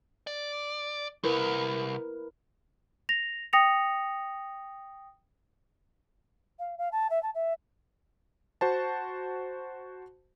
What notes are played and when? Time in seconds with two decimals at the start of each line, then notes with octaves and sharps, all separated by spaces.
0.27 D5
1.24 C2 E4 A#4 B4
3.09 A#6 F7
3.53 G5 D#6 A#6 C#7 F7
6.59 F5
6.78 F5
6.92 A5
7.10 E5
7.23 A5
7.35 E5
8.61 F#4 C5 A5